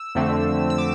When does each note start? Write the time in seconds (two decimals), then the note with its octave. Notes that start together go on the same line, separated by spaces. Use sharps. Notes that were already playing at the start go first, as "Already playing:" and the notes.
Already playing: E6
0.15 F2 D3 A3 C4
0.70 E6
0.78 D6